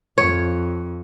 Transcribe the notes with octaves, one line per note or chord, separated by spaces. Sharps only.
F2 C#5